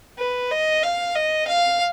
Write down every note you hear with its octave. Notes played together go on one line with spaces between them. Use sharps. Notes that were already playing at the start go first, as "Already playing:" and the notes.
B4
D#5
F5
D#5
F5